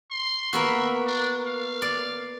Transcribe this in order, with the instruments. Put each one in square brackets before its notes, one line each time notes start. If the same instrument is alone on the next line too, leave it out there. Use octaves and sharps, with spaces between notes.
[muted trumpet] C6
[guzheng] A#3 B3 F#4 [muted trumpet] E5
[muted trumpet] D4
F5
[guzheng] D5